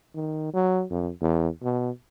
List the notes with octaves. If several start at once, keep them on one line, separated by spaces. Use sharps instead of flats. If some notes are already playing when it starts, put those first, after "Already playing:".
D#3
F#3
F2
E2
B2